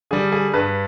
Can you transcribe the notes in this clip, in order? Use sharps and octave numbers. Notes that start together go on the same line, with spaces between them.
D3 G3 G#4
G#4
G2 B4